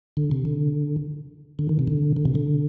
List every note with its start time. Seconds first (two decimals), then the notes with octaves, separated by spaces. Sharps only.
0.17 D3
0.31 C3
0.45 D3
1.59 D3
1.69 D#3
1.79 C3
1.87 D3
2.16 D3
2.25 C3
2.35 D3